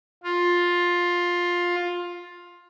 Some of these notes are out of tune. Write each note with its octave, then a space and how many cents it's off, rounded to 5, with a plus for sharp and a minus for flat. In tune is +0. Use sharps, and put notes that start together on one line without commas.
F4 +10